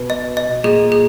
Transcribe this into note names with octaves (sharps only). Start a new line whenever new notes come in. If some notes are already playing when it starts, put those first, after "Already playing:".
Already playing: B2 B4
D#5
D#5
A#2 G#4
G#4